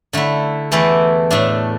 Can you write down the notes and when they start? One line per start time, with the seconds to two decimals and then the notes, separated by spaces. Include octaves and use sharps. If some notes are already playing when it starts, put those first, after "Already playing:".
0.13 D3 A3 E4
0.72 E2 E3 A3 E4
1.31 A2 A3 D4